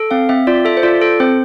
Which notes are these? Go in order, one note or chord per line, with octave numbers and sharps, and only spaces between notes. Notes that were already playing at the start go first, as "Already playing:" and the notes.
Already playing: A4
C4 F5
C4 E5
F4 D5
A4 E5
C5
F4 D5
A4
C4 C5